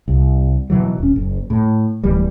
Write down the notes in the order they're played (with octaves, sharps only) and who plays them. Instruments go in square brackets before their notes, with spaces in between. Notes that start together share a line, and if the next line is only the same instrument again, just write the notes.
[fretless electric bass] C2
B2 D#3 E3 F#3
D#1 C#4
F#1
A2
D1 E3 G3